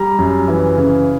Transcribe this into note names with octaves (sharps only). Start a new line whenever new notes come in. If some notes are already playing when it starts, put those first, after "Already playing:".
Already playing: G3 A#5
F#2
E3
C#3